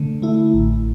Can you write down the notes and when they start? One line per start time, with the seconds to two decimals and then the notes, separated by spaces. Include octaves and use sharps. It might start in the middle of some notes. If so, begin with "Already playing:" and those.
Already playing: D3 A3
0.22 A3 E4
0.54 A1